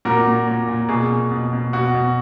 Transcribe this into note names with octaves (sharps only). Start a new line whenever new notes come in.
A#2 F#4 A#4
A#2
A#2
A#2
B2 G#4
B2
B2
B2
B2 F#4
B2